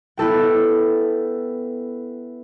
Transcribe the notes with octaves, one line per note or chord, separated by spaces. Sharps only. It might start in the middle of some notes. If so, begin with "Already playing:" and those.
B3 E4 A4 G5